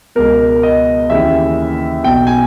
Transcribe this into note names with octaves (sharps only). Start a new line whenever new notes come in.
C#2 B2 A#4
D#5
D#2 C#3 E3 E5
B1 B2 G5
G#5